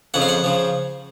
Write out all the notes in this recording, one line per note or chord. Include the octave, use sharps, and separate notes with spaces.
F2 C#3 F3 F#5
F5
F#5
C#3 F3